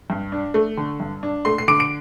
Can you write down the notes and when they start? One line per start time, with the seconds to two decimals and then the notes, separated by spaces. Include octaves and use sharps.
0.10 G2
0.32 D4
0.54 A3
0.77 D3
1.00 G2
1.23 D4
1.45 A3 C6 C7
1.58 C7
1.68 D3 D6 D7
1.80 D7